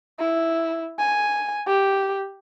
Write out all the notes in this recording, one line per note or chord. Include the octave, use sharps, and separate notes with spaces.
E4
G#5
G4